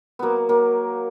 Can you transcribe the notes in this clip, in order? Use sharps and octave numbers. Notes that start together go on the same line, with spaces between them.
F#3 A#3 B3
F#3 A#3